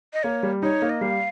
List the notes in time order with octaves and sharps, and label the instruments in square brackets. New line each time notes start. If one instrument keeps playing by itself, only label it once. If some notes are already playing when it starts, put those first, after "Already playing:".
[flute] D#5
[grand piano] A#3 [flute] C#5
[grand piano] G3
[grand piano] D#4 [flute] C#5
[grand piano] A#3
[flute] D#5
[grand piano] G3 [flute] F5